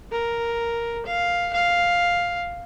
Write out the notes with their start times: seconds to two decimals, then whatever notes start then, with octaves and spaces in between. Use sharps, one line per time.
0.12 A#4
1.06 F5
1.53 F5